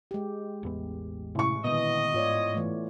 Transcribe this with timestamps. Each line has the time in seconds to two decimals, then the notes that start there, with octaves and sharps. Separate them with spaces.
0.11 G#3 G4
0.63 A1 E2 B3
1.35 A1 C3 C#6
1.64 A#2 D3 D#3 B3 D#5
2.14 G#2 F4 C#5 D5
2.54 E3 A3